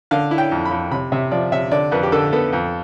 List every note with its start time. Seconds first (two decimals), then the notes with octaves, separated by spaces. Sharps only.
0.11 D3 F5
0.31 E4
0.38 G5
0.51 F2
0.65 B5
0.71 F2
0.91 C3 B5
1.12 C3 E5
1.31 F3 D5
1.52 C3 E5
1.71 D3 D5
1.92 F2 B4
2.03 G4
2.12 D3 A4
2.33 B3 A4
2.53 F2